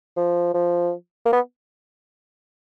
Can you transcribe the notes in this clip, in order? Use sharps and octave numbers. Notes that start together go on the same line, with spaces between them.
F3
F3
A#3
B3